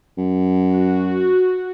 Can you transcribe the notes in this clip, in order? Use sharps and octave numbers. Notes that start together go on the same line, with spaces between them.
F#2
F#4